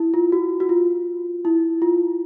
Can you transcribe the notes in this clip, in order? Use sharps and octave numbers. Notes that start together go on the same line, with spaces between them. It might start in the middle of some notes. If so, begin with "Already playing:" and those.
Already playing: E4
F4
F#4
F#4
F4
E4
F4